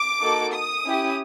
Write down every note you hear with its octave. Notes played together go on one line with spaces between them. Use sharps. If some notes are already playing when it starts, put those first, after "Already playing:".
Already playing: D6
A#3 D#4 F#4 A4
D#6
C#4 E4 G4